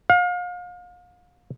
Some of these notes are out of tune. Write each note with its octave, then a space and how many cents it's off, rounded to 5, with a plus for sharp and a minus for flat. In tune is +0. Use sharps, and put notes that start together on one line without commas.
F5 +35